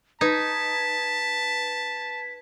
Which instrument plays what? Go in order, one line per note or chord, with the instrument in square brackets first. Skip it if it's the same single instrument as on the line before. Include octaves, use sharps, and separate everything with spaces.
[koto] D#4 [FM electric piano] B4 G#6 [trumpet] A5 [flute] B6